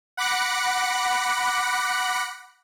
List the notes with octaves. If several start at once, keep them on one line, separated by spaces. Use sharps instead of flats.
F#5 B5 D6 F#6 A#6 C#7